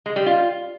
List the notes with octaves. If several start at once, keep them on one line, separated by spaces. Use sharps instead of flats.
G#3
G3
F4